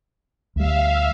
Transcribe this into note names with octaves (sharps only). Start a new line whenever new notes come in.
D2 G3 E5 F5